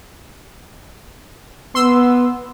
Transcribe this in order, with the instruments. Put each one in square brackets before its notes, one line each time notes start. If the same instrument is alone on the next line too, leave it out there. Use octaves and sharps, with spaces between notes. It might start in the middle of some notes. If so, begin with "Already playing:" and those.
[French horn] B3 [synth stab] C6 E6